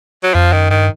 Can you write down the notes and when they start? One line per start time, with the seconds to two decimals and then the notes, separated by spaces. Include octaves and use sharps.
0.23 F#3
0.34 F2 F3
0.52 F#2 D#3
0.70 G2 D#3